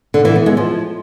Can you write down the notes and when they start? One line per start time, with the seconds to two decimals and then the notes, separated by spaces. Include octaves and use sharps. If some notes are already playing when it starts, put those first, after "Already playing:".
0.14 D3
0.25 E3
0.36 B3
0.46 G#3
0.57 F3